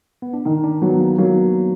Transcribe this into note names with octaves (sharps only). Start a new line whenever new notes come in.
B3
D4
D#3 D#4
D4
F#3 B3
A#3
F#3 A#3